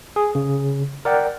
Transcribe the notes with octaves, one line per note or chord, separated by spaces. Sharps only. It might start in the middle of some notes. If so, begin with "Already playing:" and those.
G#4
C#3
A#4 D5 F#5 G5